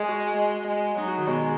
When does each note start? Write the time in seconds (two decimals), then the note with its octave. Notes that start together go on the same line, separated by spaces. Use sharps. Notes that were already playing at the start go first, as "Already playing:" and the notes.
Already playing: G#3 G#4
0.08 F#4
0.37 G#3
0.67 G#3
0.97 F#3 D#4
1.08 F#4
1.17 D#3
1.27 B2 G#3